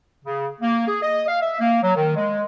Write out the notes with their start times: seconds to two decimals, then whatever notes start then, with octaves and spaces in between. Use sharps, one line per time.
0.25 C#3
0.61 A#3
0.87 G#4
1.02 D#5
1.27 F5
1.41 E5
1.60 A#3
1.82 F#3
1.95 D#3
2.16 G#3